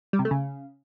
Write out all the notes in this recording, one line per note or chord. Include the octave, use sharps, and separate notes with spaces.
G3
C3
A3
C#3